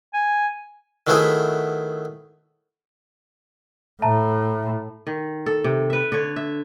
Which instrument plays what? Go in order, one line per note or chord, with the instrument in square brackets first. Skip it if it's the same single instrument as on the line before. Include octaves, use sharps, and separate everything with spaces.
[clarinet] G#5
[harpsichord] D#3 F#3 A3 B3 E4 G#4
[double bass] A2 [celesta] E5 A5 A#5
[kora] D#3
A4
C3
B4 E5
D3 C#5
E5